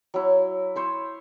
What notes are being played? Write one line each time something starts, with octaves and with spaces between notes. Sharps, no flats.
F#3 E4
E4 C5 C#5